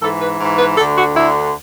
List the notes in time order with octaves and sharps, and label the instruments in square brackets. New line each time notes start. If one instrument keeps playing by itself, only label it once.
[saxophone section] G#2 E3 A4
B4
G#2 E3
B4
D2 A4
D3
F#4
D2 D3 E4